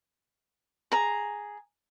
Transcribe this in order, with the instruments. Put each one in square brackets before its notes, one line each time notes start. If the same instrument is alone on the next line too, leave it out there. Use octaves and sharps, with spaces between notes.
[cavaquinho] G#4 A#5